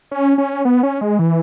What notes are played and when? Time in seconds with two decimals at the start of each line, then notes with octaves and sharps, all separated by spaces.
0.11 C#4
0.38 C#4
0.65 B3
0.83 C#4
1.01 G#3
1.19 E3